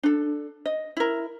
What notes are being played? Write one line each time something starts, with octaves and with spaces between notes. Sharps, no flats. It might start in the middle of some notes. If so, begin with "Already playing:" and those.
D4 A4
D#5
E4 A#4